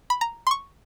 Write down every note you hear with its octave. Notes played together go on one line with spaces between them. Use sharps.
B5
A#5
C6
C#6